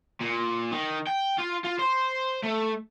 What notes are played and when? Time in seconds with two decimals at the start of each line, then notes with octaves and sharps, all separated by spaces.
0.20 A#2
0.72 D#3
1.07 G5
1.39 F4
1.65 F4
1.79 C5
2.44 A3